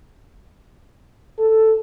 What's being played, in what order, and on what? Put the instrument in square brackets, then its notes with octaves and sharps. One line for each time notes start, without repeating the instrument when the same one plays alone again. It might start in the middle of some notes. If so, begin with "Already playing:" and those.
[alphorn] A4